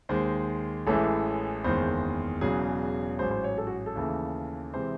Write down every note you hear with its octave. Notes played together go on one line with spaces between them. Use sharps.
D#2 D#3 G#3 C5
A1 A2 E3 G#3 A4
F#1 E2 D#3 G#3 C5
E1 E2 C#3 F#3 G#4
A1 G#2 F#3 C5
C5
C#5
A4
F#4
A4
D#2 C#3 E3 A3
C3 E3 G#3 C5